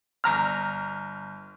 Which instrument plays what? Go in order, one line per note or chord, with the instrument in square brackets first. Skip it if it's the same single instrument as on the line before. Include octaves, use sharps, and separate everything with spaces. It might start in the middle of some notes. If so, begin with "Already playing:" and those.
[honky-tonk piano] G1 A#5 F6